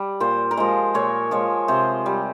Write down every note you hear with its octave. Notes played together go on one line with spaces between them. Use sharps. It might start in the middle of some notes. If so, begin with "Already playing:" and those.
Already playing: G3
A#2 C5
A#4
F3 G#3 C5
A#2 C#5
F3 G#3 C#5
C3 C5
G3